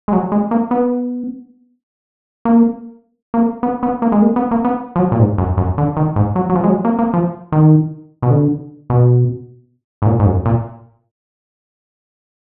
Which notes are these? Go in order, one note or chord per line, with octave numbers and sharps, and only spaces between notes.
G#3
F#3
G#3
A#3
B3
A#3
A#3
B3
B3
A#3
G#3
A#3
B3
A#3
B3
F3
F#3
A#2
G#2
F#2
F#2
D3
D#3
G#2
F#3
F#3
F3
G#3
F#3
A#3
A#3
F3
D#3
B2
D3
B2
G#2
A#2
G#2
F#2
A#2